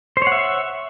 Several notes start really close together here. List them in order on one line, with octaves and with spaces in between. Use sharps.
C5 C#5 F#5 E5